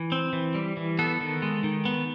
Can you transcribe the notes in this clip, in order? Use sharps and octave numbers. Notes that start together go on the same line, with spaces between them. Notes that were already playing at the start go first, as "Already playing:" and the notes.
Already playing: E3
C4
E3
G3
E3
B3 A4
D#3
G#3
D#3
B3